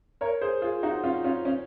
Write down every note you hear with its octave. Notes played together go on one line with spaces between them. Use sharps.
A#4 C#5
G#4 C5
F4 G#4
D#4 F#4
C#4 F4
C#4 F4
C#4